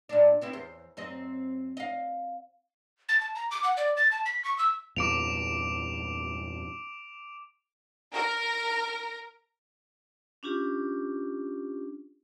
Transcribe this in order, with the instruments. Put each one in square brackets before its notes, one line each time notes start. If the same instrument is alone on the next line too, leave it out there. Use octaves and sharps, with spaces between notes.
[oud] A#2 D4
B3 C4 E4
E2 C5
F#2 C4 D#5
D#5 F5
[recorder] A6
A5
A#5
D6
F#5
D5
A6
A5
B6
C#6
E6
[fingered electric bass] E2 G2 A#2 [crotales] D6 D7 F7
[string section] A#4
[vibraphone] C#4 D4 F4 G4